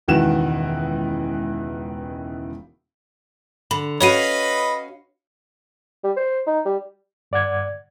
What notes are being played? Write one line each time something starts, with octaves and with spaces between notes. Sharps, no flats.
E1 C#2 D#3 E3 F#4 E7
D3 B5
C#4 F#4 B4 C#5 D#5 F5 B5 D#7
G3
C5
D#4
G3
G2 D5 F#5 G#6